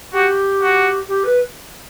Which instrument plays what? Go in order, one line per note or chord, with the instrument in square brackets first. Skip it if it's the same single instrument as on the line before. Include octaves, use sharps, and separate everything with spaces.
[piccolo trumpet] F#4 [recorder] G4
[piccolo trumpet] F#4
[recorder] G4
B4